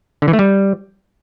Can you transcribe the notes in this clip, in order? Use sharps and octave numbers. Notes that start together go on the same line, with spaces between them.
D3
E3
A3
G3